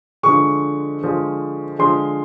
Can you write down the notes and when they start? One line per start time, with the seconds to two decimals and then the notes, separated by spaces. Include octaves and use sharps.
0.23 D3 F3 G#3 C#6
1.01 D3 F3 G#3
1.79 D3 F3 G#3 C6